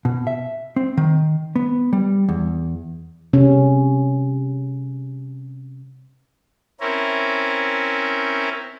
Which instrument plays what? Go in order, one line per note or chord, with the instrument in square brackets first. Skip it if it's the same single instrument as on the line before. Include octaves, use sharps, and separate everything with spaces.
[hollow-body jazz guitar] B2
E5
C4
D#3
B3
G3
E2
[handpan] C3 C#4
[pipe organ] C4 C#4 E4 A#4